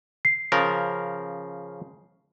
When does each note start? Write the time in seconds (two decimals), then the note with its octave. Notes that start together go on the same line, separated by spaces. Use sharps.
0.25 C7
0.52 C#3 F3 A#4